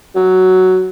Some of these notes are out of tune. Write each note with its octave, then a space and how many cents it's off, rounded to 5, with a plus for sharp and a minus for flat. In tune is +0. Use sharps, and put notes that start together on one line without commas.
F#3 +5